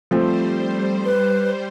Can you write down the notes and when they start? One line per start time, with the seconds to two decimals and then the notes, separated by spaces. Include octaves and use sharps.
0.11 F3 G3 A3 C4 C5
1.05 B4